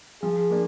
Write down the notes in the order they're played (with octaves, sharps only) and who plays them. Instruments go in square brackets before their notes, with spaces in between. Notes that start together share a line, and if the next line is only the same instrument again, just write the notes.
[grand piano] F3 [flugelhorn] G#4
[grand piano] A#3 D4